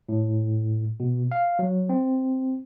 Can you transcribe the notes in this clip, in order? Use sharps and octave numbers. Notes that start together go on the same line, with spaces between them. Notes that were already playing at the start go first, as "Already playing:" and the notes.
A2
B2
F5
F#3
C4